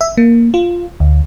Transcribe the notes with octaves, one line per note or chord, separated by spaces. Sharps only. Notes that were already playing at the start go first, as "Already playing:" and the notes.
E5
A#3
F4
D2